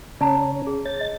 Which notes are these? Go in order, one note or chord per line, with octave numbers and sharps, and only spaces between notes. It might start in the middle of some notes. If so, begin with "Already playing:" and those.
C#3 C#4 D5 A5 A#5
G#4
C#5 A6
D#5